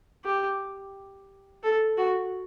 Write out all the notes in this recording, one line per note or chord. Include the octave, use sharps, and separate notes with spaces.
G4
A4
F#4